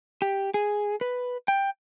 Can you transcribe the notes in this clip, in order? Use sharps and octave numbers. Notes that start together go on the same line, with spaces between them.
G4
G#4
B4
G5